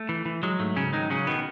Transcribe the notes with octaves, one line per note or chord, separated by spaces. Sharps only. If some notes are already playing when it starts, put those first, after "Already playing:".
Already playing: A3
E3
E3
F#3 G#3
G#2 A3
G#2 C#3 C#4
D#3 F#3 D#4
C#3 F#3 C#4
B2 D#3 B3